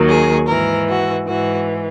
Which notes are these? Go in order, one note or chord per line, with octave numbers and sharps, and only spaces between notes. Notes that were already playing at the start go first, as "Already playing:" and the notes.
Already playing: D#2 D#3 F#3
G#4
G#2 E3 A#4
F#4
G#2 E3 F#4